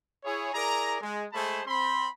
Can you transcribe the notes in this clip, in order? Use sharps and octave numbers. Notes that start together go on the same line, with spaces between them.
E4 G#4 C#5
E4 G#4 A#4 D5 A#5
G#3
G#3 A3 G#4 C5 A5 B5
C4 B5 C6